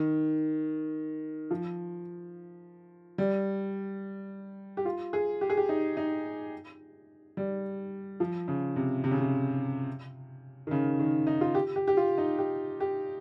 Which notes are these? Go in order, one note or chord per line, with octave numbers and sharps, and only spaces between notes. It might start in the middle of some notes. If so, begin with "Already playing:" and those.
Already playing: D#3
F3
G3
G4
F4
G#4
G4
G#4
G4
D#4
D#4
G3
F3
C#3
C3
C3
C#3
C3
D#3
C#3
D#3
D#4
F4
G4
G4
G4
F4
D#4
G4
G4